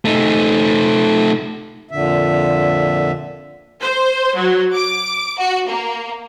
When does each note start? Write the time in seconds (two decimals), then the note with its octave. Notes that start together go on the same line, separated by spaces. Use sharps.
0.05 A3 D#4
1.91 F2 A#2 D3 E5
3.80 C5
4.36 F#3
4.74 D6
5.38 F#4
5.69 A#3